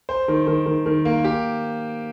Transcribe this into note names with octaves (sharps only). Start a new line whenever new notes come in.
C5
D#3
D#3
D#3
D#3
A#3
G4